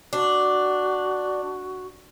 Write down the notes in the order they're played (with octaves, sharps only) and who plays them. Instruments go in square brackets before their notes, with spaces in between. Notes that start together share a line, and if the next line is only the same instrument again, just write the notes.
[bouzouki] D4 [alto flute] F#4